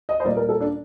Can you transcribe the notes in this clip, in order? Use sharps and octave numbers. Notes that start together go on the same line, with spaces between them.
D#5
C5
A#2 G3 A#3 D5
A#4
A4
D4